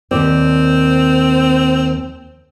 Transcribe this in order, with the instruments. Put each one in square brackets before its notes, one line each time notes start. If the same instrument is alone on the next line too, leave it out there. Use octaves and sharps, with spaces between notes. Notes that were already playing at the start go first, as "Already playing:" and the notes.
[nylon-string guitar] D#2 B2 D5 [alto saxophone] C4